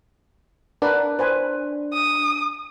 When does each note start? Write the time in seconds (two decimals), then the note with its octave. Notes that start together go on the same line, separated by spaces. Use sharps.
0.82 D4 A#4 B4 F#5
1.19 B4 C5 G#5
1.93 D#6